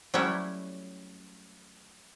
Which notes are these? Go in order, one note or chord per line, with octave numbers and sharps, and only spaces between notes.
F#3 G3 A3 C#4 E4